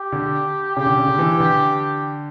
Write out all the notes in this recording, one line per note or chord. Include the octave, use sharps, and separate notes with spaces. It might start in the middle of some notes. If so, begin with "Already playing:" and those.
Already playing: G4
D3
C#3 G4
D3
C#3
D3
E3
D3